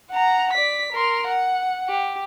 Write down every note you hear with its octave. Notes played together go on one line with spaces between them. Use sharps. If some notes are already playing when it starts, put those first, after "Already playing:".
F#5 A#5
D5 B6
A#4 C6
F#5
G4